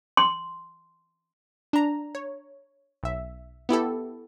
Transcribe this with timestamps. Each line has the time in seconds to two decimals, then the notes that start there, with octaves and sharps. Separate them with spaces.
0.17 C6
1.73 D4 A#5
2.15 C#5
3.03 B1 E5
3.69 B3 E4 G4 A4